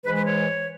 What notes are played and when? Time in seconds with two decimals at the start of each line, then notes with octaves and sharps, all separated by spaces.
0.04 G#2 E3 G#3 B4
0.15 B4
0.25 C#5